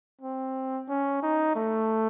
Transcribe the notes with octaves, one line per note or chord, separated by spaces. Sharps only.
C4
C#4
D#4
A3